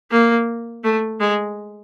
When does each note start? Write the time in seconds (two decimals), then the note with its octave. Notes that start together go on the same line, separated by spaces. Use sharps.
0.11 A#3
0.84 A3
1.20 G#3